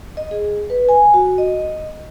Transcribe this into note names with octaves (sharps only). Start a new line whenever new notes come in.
D#5
G#4
B4
G#5
F#4
D#5